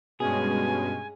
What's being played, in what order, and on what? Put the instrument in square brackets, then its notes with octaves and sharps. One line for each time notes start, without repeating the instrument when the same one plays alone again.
[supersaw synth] G2 G#3 C#4 [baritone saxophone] B2 [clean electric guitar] G#4 [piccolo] G#5